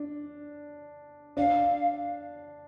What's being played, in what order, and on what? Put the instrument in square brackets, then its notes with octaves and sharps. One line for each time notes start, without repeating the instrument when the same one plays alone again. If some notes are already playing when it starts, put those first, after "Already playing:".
Already playing: [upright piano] D4
[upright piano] D4 [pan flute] F5